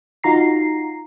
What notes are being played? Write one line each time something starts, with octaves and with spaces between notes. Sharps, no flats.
D#4 F4 F#4 A#5 C7